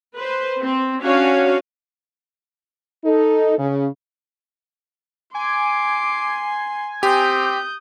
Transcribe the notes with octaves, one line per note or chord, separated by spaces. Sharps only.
B4 C5
C4
C#4 D4 F#4 C#5 F5 G#5
D#4 A4
C#3
G#5 C6 D6 C7
C4 G4 D#6 G6